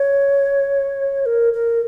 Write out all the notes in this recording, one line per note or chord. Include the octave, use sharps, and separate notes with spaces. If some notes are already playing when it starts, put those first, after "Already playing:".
Already playing: C#5
A#4
A#4